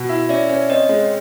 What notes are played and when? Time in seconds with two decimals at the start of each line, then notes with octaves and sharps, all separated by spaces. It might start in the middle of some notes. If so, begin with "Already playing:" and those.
Already playing: B2
0.09 E4
0.29 C#4 D5 E5
0.49 C#4
0.69 C4 C#5 D#5
0.89 G#3